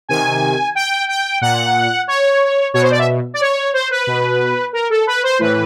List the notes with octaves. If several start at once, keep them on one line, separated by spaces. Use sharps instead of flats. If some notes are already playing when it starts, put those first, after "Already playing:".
C3 D#3 G#5
G5
G5
A#2 F#5
C#5
B2 C#5
C5
D5
E5
D5
C#5
C5
B4
B2
A#4
A4
B4
C5
A2 E3 B4